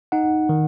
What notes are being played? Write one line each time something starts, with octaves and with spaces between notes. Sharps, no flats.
D#4 F#5
D#3